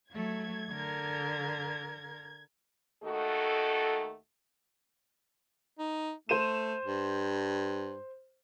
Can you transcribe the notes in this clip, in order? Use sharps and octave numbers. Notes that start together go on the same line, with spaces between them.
F#3 A3 G#6
D3 A#4
D#2 A3 D#4 F#4 A4
D#4
A3 C5 D#7 E7
G2